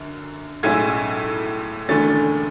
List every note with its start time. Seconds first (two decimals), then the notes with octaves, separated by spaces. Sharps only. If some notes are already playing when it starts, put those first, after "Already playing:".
Already playing: F#2 D3
0.63 B1 A2 G#3 C#4 E4 G#6
1.89 E1 E2 D3 A3 C#4 A6